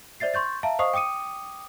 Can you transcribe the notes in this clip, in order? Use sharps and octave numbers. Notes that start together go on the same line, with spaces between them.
C5 D5 E5 A6 C7
C6 C#6 G6 A6
E5 F5 A5 A#5
C5 D#5 F5 C#6 D#6 C7
G5 D6 D#6 C#7 D#7